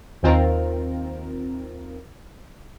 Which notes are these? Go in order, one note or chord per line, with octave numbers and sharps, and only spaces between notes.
D#2 D#3 C4 F4 A#4